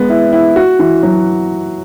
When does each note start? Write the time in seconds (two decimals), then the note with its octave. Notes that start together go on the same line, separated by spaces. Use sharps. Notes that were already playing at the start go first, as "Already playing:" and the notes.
Already playing: G#3 B3
0.10 E4
0.33 E4
0.56 F#4
0.79 E3
1.03 F#3